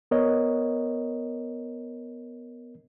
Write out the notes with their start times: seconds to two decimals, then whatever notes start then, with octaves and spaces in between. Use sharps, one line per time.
0.11 B3 A#4 C#5 D#5